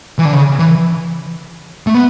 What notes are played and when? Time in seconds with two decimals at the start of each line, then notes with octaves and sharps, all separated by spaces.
0.19 E3
0.25 D3
0.33 C#3
0.59 E3
1.87 A3
1.94 B3